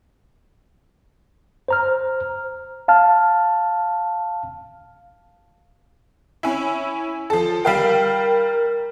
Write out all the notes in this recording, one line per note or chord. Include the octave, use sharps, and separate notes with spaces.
C5 A#5 F6
F5 A5 F6
C#4 E4
F3 A4
G3 A#4 F5 G5